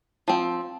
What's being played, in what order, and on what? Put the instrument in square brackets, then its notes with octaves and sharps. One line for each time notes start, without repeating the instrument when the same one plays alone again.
[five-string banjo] F3 C4